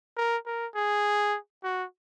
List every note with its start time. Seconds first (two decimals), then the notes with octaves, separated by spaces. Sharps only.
0.16 A#4
0.46 A#4
0.75 G#4
1.64 F#4